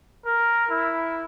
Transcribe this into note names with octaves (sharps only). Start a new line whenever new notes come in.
A#4
E4